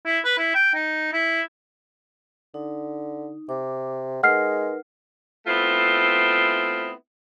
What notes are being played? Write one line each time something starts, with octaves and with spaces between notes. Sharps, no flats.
E4
B4
E4
G5
D#4
E4
D3 D#4
C3 D6
G#3 D#4 A#4 B4 F#5 F6 C7
A3 B3 C4 E4 F4